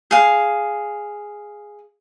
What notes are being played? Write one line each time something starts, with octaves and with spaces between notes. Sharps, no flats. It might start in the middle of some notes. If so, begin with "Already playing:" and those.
G#4 F5